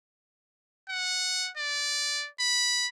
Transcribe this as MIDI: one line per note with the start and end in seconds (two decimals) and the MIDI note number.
0.89 1.49 78
1.57 2.27 74
2.40 2.87 83